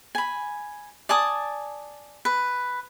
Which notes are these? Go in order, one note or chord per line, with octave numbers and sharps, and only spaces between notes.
G#5 B5
D5 G#5 A5 D#6
B4